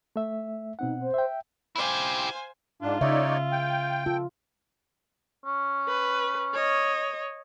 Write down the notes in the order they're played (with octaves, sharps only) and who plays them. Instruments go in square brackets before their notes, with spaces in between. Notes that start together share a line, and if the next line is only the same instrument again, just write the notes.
[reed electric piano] A3 E5
[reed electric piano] B2 C4 F#5 [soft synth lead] D#4
[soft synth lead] C5
[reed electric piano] E5 G5
[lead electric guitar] E4 G4 [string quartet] C5 F5 G#5
[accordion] G#2 D4 [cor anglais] F4
[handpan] C#3 E5 [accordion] D#4 C#5 D5
[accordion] G5
[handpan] F4 [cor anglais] A4
[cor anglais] C#4
[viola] B4
C#5 D#5